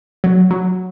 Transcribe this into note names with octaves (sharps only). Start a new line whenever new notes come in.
F#3
F#3